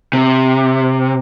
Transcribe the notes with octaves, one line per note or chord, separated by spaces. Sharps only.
C3